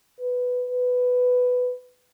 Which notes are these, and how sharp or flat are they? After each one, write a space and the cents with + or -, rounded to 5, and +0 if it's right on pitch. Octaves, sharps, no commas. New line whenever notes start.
B4 +5
B4 +5